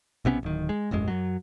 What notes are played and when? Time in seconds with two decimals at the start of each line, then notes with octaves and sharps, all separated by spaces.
0.25 B1 C3 B3 C#4
0.43 D1 D#3
0.69 G#3
0.91 E1 A1 F#2 G#3
1.08 F#2 F#3